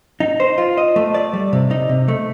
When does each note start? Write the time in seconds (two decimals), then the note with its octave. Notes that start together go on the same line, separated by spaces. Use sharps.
0.20 D#4
0.40 C5
0.58 F4
0.77 D#5
0.96 A3
1.14 D5
1.33 G3
1.53 C3
1.71 D#4
1.89 C3
2.08 A3